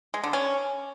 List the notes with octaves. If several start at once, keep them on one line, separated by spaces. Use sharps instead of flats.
G#3
D3
C#4